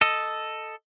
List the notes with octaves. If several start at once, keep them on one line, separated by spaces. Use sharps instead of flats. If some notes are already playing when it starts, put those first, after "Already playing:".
A4 D#5